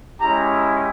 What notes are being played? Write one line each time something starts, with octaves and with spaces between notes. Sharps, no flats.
G#3 C#4 E4 G4 A#5